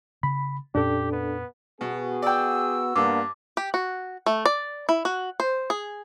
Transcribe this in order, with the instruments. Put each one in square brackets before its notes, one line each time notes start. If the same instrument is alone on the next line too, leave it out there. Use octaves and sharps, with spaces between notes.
[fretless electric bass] C#3 [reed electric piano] B5
[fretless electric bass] F2 A#2 C#4 [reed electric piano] D4 A4 [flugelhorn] G4
[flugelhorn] B3
[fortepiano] B2 [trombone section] B3 F#4 G#4
[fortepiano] D5 G5 [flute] E6
[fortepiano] G2 [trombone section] A#3 B3 D4 [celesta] D6
[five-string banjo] G4
F#4
A3
D5
E4
F#4
C5
G#4